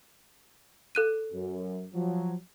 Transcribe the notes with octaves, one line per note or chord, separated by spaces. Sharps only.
A4 F#6 D#7
F#2
F3 F#3